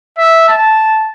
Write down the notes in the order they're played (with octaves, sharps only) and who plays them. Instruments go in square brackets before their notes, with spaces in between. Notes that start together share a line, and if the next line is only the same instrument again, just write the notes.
[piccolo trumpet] E5
A5